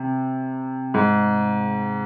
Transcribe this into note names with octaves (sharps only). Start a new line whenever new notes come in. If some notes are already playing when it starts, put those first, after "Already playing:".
Already playing: C3
G#2